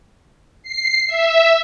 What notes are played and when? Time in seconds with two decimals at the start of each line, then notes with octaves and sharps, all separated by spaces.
0.63 C7
1.07 E5